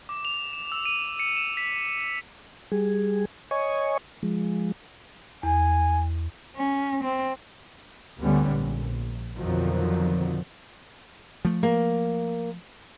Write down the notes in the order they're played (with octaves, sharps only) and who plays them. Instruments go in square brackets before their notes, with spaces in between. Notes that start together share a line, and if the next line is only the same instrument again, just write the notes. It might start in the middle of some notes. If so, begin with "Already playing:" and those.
[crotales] D6
F7
E7
E6
D#7
C#7
E7
B6
[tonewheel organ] G3 G#4
C#5 D#5 G#5 C#6
F3 G#3
[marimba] E2 [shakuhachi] G#5
[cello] C#4
C4
[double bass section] D2 G#2 D3 G3 B3 C#4
A#1
F2 B2 D3 D#3 F3 F#3
[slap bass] F3 A3
[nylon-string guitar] A#3